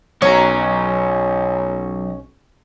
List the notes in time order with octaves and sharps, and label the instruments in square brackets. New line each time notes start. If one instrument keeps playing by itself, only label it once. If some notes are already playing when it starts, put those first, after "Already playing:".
[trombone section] B1 [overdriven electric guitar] F#3 A#5 [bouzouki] C#4